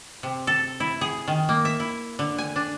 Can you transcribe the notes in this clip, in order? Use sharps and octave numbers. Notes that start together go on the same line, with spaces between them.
C3
A4
E4
G#4
D#3
A#3
E5
E4
D3
G#5
D4